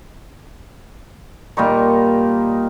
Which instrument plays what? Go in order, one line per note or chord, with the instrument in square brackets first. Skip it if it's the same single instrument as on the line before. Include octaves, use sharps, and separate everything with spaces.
[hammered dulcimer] A#2 G3 D#4 C#6